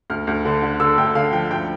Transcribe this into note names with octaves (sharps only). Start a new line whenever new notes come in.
D2 F6
D2
D3
D3
D3 E6
D2 G5
D3 F5
F3 G5
D2 G5